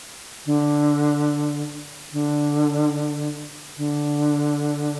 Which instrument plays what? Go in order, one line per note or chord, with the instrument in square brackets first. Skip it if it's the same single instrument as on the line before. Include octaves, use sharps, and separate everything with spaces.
[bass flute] D3
D3
D3